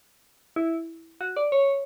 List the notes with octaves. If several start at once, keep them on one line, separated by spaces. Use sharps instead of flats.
E4
F#4
D5
C#5